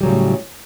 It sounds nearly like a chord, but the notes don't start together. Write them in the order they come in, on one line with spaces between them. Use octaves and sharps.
G3 F#3 C#3 A2